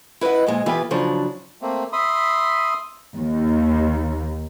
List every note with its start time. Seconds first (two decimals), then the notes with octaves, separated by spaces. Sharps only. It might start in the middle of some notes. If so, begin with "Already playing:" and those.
0.21 E4 B4 C5 D#5 F#5
0.47 F2 A#2 G#3
0.66 E3 B3 F4 G4 B4
0.91 C#3 F3 F#3 D4
1.62 A3 A#3 C4
1.93 E5 B5 C6 D#6
3.16 D#2